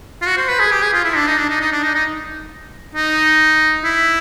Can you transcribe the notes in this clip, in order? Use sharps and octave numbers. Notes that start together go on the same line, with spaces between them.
F4
F#4
C5
B4
G#4
G4
G#4
F4
E4
D4
D#4
D4
D#4
D#4
D4
D#4
D#4
D#4
E4